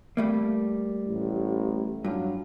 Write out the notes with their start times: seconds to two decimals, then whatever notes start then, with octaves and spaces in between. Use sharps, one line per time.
0.17 G3 A3 A#3
1.08 A1
2.04 G2 F#3 F4